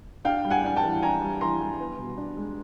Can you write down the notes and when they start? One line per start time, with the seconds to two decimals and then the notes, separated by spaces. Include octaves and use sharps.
0.25 D4 F5 G5
0.45 G3
0.50 F#5 G#5
0.64 D4 G#5
0.76 G5 A5
0.84 E3
1.03 D4 G#5 A#5
1.22 G3
1.41 E3 A#5 C6
1.61 G3
1.80 B3
1.99 B2
2.18 D4
2.37 G#3